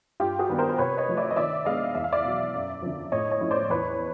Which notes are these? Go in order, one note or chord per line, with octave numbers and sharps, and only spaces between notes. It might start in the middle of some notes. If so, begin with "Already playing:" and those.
G2 F4 G4
F#4 G#4
D#3 G3 B3 D4
A#4 C5
C5
C3 B4 C#5
C#5 D#5
F3 A3
D5 E5
D#5
D#3 D5 E5
G#3 B3 D4 D#5 F5
E2 E5
F5
D5 E5
B2 F#3
F#2
D3 F3
A2 C#5 D#5
C#5 D#5
F3 A3 C#4 E4
C5 D5
E2 B4 C#5